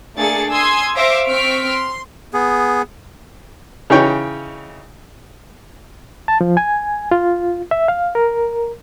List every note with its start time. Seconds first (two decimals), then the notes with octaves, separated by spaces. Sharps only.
0.16 A3 A#3 D4 G#4 A6 C#7
0.52 G#5 C6 D#6 E6 G#6
0.96 C5 E5 F5 D6 A#6
1.26 C4 C5 C#6 F6 B6 D7
1.69 C6
2.33 B3 G#4
3.90 C#3 E3 D#4 C#5 G5
6.28 A5
6.41 F3
6.57 G#5
7.11 F4
7.71 E5
7.88 F5
8.15 A#4